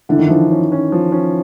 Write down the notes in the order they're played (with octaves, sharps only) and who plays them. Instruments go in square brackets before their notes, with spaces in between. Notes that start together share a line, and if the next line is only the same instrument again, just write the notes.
[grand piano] D3 [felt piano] E3
[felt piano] D#3
[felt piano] E3 [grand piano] F3
[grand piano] C#4
C#4
F3
C#4